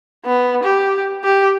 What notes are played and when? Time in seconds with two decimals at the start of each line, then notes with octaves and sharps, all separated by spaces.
0.25 B3
0.63 G4
1.24 G4